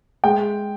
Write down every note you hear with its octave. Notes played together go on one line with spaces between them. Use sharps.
G#3 G5